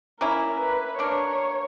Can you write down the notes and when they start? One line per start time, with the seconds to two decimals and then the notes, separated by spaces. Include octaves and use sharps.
0.20 A#3 C#4 E4 A#4
0.59 B4
0.98 A#3 D4 A#4 C#5